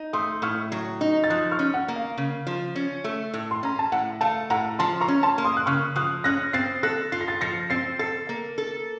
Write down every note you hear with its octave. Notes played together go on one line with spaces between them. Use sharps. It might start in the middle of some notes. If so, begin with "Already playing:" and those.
Already playing: D#4
A3 C6 D#6
A2 C#6 F6
F#3
D#4
A6
F3 D#6 F#6
C#6 F6
C#4
F#5
A#3
F5
C#3
F3
C#4
A3
A2
C6
C#4 A#5
A5
A2 F#5
A3 F5 A5
A2 F#5 A#5
F3 A5 C6
A#5 C#6
C#4
A5 C6
A#3
C6 D#6
F#6
C#3 C#6 F6
F3 D#6 F#6
C#4 F#6 A#6
C4 A6 C7
A4 F#6 A#6
F4 C7
A#6
A6 C7
F3 A#6 C#7
C4 A6 C7
A4 A6 C7
A#3
A4